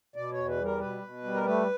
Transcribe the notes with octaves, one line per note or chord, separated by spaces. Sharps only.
B2 D5
C#5
E2
B4
G3
A#4
B2 B4
B2
G3
A#4
A3 B4